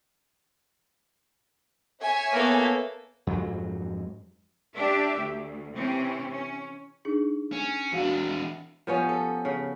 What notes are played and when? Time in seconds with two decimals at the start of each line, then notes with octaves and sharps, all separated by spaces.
2.02 C#5 E5 G#5
2.33 A#3 B3 A4
3.27 F2 G#2 F#3
4.76 D4 G4 E5
5.20 D2
5.76 C3 E3 C4 C#4
6.33 C#4
7.05 D4 D#4 G#4
7.52 C#4
7.92 E2 D4 F#4 F5
8.87 F3 B3 C#4
9.09 A4
9.45 C#3